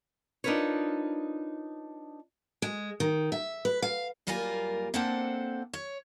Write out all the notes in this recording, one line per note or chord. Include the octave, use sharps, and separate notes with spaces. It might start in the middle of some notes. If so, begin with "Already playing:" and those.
D4 D#4 F4 A#4 B4 C#5
G#3
D#3
E5
B4
F5
F#2 G3 A#3 F4 A#4 G#5
A#3 C4 D4 A4 C5 F#5
C#5